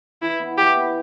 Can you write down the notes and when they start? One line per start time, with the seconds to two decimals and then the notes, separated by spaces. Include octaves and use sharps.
0.22 E3 E4
0.39 B3 E4
0.58 E3 G4
0.75 B3 E4